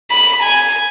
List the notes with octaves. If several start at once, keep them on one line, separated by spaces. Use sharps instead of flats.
B5
G#5